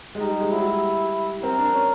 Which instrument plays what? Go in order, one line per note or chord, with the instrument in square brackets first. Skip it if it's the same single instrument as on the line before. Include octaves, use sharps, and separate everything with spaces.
[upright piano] G#3
[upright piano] G3 [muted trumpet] D#4
[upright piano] G3
G#3
[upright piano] F#3 [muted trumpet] E4
[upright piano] F#3
G3
[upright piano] C4 [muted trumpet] A#4
[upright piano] D4
C#4